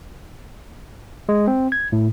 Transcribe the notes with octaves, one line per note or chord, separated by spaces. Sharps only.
G#3
C4
G#6
A2